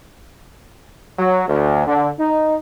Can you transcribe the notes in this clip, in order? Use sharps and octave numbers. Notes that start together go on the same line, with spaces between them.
F#3
D2
D3
D#4